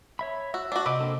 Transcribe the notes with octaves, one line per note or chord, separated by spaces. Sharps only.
C#5 E5 B5
F#4 E6
D4 F#4
C3 C4 D#5 B5 D6
A#3 D4 A4